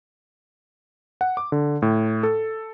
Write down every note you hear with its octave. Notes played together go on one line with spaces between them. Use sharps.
F#5
D6
D3
A2
A4